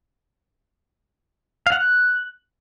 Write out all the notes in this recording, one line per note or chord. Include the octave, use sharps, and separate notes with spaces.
F5
F#5
F#6